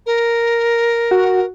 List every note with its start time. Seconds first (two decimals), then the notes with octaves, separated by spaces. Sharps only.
0.06 A#4
1.11 F#4